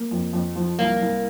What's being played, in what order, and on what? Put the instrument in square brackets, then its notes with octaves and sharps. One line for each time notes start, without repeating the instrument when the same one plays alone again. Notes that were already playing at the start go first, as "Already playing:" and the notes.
Already playing: [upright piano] A#3
F2
F2
F3
[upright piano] C2 [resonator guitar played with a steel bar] A#3
[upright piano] C2